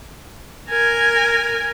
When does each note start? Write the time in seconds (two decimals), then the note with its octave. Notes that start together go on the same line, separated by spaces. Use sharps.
0.69 A#4 G#5